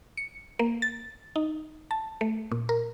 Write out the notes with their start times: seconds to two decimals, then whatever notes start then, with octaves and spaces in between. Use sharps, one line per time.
0.17 C#7
0.59 A#3
0.82 A6
1.36 D#4
1.91 A5
2.21 A3
2.52 A#2
2.69 A#4